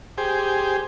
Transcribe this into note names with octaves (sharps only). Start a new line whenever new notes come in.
G4 G#4 C5